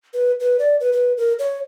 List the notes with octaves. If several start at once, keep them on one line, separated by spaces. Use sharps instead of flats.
B4
B4
D5
B4
B4
A#4
C#5